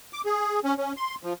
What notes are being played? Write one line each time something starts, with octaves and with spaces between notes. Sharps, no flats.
D6
G#4
C#4
C#4
C6
F3